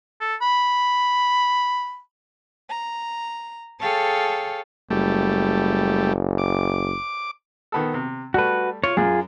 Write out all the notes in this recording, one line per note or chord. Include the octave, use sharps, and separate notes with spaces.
A4
B5
A#5
G#4 A4 C#5 F5 G5 A5
F#1 G3 A3
D6
D#3 B3 A4
C3
G3 A3 F#4 B4
F4 C#5
F#2 F4 G#4